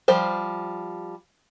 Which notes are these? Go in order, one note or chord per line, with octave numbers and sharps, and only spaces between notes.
F3 G3 C5